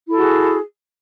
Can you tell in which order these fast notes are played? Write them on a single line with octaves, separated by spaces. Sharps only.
E4 A4 F#4 G#4